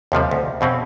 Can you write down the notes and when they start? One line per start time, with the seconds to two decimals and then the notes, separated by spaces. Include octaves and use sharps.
0.12 D#2 C3 F3 G3
0.31 D2
0.61 F2 B2 C4 C#4